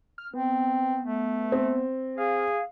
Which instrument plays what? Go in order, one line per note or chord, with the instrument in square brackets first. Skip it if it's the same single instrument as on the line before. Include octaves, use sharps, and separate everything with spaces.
[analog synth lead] F6
[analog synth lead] B3 [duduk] C4
[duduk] A3
[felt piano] C4
[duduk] G#4 [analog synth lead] F5